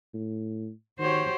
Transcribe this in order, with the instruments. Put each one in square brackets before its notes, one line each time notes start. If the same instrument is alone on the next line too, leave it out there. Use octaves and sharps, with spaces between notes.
[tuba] A2
[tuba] D#3 [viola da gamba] F#4 C#5 [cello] G4 C5